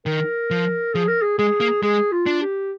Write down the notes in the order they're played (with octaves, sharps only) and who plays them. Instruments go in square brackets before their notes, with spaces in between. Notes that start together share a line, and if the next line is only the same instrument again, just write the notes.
[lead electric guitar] D#3 [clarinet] A#4
[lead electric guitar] F3
[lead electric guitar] F3 [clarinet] G#4
[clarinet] A#4
G#4
[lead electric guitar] G#3 [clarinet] G#4
[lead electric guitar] A#3
[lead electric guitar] G#3 [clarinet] G#4
[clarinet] F4
[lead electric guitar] D4
[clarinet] G4